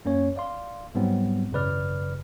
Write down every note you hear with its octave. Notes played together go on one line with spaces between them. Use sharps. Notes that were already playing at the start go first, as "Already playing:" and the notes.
F#2 A#3 C#4 C#5
D5 F5 C6
G#2 F#3 G3 B3 C4
G#1 F#2 C#3 B4 D5 F6